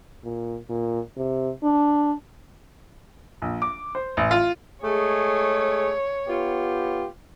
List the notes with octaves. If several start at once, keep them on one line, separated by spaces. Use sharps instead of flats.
A#2
A#2
C3
D4
A#1
D6
C5
A1
F4
G#3 A3 G#4 C#5
B3 F4 G4